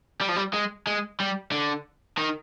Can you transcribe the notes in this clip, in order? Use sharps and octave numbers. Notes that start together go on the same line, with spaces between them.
G3
F3
G3
G#3
G#3
G3
D3
D#3